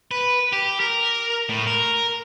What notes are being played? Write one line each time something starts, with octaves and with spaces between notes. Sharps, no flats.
B4
G4
A#4
A2
A#4